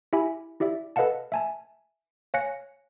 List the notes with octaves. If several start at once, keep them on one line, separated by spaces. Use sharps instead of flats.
E4 G4 E5 G#5 B5
E4 G4 D5 E5
A4 B4 D#5 F5 F#5 A5
E5 G#5 A5
C#5 F5 G#5 F#6 A#6 C#7